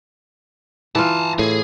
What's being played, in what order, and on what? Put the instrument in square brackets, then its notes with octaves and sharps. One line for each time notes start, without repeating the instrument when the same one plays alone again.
[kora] E3 F4 [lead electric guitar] G#5 A5
[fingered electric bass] A2 [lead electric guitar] G#4